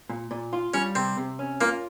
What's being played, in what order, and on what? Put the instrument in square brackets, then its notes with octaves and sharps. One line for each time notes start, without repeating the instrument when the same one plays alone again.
[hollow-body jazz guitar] A#2
A#2
F4
[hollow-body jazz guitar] G3 [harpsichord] C#4
[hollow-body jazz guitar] C3 [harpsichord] C4
[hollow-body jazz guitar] C3
C#4
[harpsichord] A#3 [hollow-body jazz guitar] F4